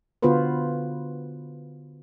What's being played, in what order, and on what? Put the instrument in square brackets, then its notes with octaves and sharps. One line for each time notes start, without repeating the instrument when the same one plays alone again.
[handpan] D3 B3 F4 F#4 B4 C5